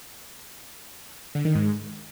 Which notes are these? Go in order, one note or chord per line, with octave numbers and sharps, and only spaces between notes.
D3
D#3
G#2